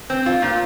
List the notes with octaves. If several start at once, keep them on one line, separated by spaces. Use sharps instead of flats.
C4
F4
A#2